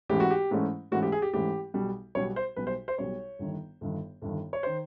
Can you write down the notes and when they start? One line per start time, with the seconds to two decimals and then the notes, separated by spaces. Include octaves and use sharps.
0.09 G#2 E3 A3 C#4 G4
0.20 F#4
0.31 G4
0.51 G#2 E3 A3 C#4
0.91 G#2 E3 A3 C#4 F#4
1.03 G4
1.12 G#4
1.22 G4
1.33 G#2 E3 A3 C#4 G4
1.74 B1 B2 G3
2.15 B1 B2 G3 C#5
2.36 C5
2.56 B1 B2 G3 B4
2.67 C5
2.88 C5
2.98 B1 B2 G3 C#5
3.39 G1 G2 D#3
3.81 G1 G2 D#3
4.22 G1 G2 D#3
4.53 C#5
4.63 D#3 C5